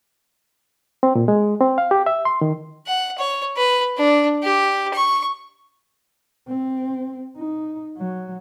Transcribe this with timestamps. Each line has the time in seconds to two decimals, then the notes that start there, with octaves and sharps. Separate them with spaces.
1.03 C4
1.15 A#2
1.28 G#3
1.61 C4
1.78 F5
1.91 G4
2.06 E5
2.25 C6
2.41 D#3
2.87 F#5
3.18 C#5
3.56 B4
3.97 D4
4.43 G4
4.93 C#6
6.48 C4
7.37 D#4
7.97 F#3